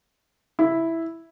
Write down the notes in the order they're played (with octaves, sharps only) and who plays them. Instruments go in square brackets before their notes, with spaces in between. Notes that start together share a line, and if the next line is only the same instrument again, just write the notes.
[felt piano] E4